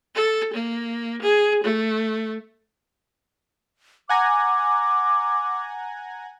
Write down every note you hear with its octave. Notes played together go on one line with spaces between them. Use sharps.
A4
A#3
G#4
A3
F#5 G#5 A#5 D6